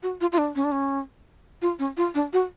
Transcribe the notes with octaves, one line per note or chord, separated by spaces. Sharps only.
F#4
F4
F4
D4
C#4
D4
C#4
F4
C#4
F4
D4
F#4